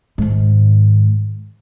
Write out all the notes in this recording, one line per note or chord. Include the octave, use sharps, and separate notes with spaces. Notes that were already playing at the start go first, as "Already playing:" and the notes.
G#2 D#3